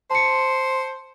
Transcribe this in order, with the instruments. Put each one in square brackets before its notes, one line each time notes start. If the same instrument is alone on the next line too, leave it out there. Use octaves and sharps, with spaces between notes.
[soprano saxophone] C5 [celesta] A5 C#7